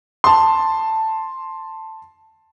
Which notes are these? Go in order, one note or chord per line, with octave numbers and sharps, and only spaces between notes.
A5 C6